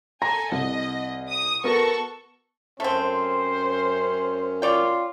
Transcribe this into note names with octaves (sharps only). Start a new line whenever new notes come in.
A4 G#5 A#5 A#6
C2 D#5
D#6
B3 F#4 A4 A#4 C#6
F#2 A3 C4 C#4 C5
F4 C#5 D5 G5